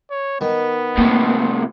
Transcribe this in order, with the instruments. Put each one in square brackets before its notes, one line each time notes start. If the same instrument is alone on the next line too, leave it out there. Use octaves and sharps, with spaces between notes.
[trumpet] C#5
[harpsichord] D#3 [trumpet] B3
[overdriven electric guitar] A2 C3 [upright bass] A#3